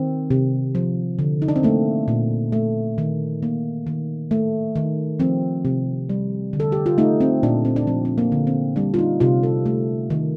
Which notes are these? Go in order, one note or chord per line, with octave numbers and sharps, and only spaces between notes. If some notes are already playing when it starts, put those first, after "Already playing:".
Already playing: D#3 C4
C3
F3
D3
D#4
D4
C4
A3 A#3
A#2
A3
D#3
A#3
D#3
A3
D#3
F3 C4
C3
G3
D3
A4
G4
F4
A3 D#4
C4
A#2 D4
C4
D4
F3 C4
C4
A#3
D3
C4
G3 D4
F4
D#4
C3 F4
A4
A3
D#3